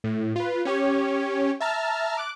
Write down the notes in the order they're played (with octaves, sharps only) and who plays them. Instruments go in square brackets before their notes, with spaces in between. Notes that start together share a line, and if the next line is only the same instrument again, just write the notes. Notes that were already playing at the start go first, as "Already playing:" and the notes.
[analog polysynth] A2
F4 B4
C#4 G4 C#5
E5 A5 A#5 F6 A6
D6 F#6 D7